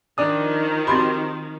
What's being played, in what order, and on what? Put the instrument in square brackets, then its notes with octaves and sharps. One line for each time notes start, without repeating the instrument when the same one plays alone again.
[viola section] D#3 F3 [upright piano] D4 D#6
[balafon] C4 F#4 B5 [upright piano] G4 C6